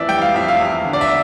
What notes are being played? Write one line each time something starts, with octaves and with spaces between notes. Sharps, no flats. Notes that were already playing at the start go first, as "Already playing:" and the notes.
Already playing: F2 E3 D5 E5
G3 G5
F5
F2 E5
F5
E2
D3
D5
E5